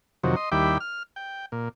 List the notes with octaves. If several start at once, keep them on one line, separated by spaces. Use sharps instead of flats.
F2 C3 D#3 F#3
D#5 C6
D#2 G3 E4 G5 B5 D6
F6
G5
A#2